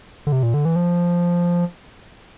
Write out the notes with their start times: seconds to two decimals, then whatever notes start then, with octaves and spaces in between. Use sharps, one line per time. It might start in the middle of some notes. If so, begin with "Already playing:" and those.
0.27 D3
0.32 C3
0.43 A#2
0.54 D3
0.65 E3
0.76 F3